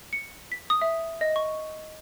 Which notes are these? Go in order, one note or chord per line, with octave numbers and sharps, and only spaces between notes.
C#7
B6
D#6
E5
D#5
C#6